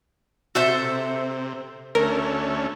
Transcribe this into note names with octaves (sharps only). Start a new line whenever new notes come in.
C3 F#4 A4 C5 E5
D2 A3 C#4 A#4